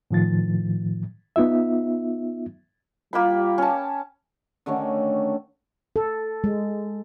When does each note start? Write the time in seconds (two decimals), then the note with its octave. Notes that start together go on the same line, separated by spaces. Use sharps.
0.11 A2 D#3 F3 A6
1.36 B3 D#4 F4 E5
3.13 G3 A#3 F4 G5 B5
3.58 C#4 A5
4.66 D3 D#3 A3 C#4
5.96 A4
6.44 G#3